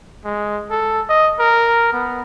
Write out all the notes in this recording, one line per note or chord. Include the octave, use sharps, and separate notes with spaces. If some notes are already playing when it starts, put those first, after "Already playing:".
G#3
A4
D#5
A#4
B3